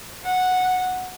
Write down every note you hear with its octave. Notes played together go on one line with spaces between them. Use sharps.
F#5